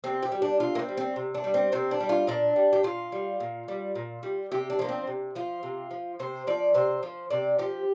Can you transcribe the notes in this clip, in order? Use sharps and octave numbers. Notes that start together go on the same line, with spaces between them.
C3 C4
G4
G3
D4
C3 F4
A#3
C4
G3
C4
C3
D4
G3
C4
C3 C4
D4
G3
F4
A#2 D4
G3
G4
A#2 F4
G3
A#2
G3
A#2
G3
C3 G4
D4
F3 A#3
C4
C3
F3 F4
C3
F3
C3 C5
F3 D5
C3 C5
F3
C3 D5
F3 G4